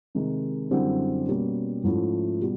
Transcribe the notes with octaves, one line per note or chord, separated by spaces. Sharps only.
C3 D#3 G#3
F#2 D3 G3 C4 E4
B2 G3 A#3 C#4
G#2 F3 A3 C#4 E4
B2 G3